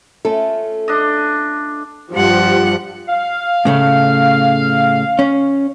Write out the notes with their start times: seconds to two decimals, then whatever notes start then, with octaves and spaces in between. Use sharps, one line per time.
0.25 A3 C#4 F4 A4
0.88 D4 D#5
2.14 G2 F3 G4 F#5
3.08 F5
3.65 A2 C#3 A3
5.19 C#4